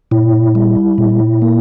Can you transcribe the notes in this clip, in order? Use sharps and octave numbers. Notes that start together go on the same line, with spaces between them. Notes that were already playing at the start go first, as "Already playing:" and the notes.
A#2 E4
G3
A#2
A#3